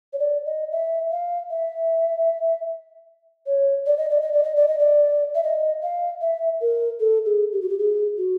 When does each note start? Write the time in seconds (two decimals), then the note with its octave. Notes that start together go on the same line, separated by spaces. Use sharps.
0.13 C#5
0.19 D5
0.46 D#5
0.72 E5
1.11 F5
1.51 E5
3.47 C#5
3.86 D5
3.98 D#5
4.10 D5
4.21 D#5
4.33 D5
4.44 D#5
4.56 D5
4.68 D#5
4.79 D5
5.35 E5
5.43 D#5
5.83 F5
6.21 E5
6.61 A#4
7.00 A4
7.26 G#4
7.52 G4
7.61 F#4
7.69 G4
7.79 G#4
8.18 F#4